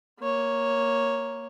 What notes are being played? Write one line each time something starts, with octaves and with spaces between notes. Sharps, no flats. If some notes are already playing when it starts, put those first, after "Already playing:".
A#3 C#5